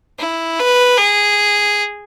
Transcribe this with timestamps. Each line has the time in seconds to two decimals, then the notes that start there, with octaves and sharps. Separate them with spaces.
0.19 E4
0.59 B4
0.98 G#4